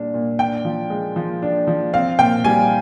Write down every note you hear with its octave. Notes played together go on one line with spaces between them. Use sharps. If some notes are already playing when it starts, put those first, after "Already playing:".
Already playing: A#2 G3 D4
A#2
D4 G5
F3
G#3
F3
D4
F3
C4 F5
A#2 G5
G3 G#5